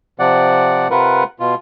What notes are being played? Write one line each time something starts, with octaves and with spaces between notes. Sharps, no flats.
C3 F3 D5 F#5
C3 F4 A#4 B4 F#5
B2 F4